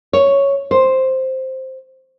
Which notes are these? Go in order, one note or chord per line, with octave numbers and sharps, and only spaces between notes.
C#5
C5